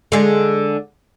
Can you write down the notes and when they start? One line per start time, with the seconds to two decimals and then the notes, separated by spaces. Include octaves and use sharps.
0.12 D3 G#3